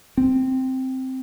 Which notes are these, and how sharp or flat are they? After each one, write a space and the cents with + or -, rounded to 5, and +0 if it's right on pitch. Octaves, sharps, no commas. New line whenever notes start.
C4 +0